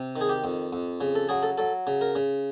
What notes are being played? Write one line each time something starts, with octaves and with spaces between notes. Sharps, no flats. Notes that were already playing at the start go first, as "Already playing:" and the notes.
Already playing: C3
D#3
G#4
G4
F2
F2
C#3
A4
F#3 G#4
A4
F#3 A4
C#3
A#4
C#3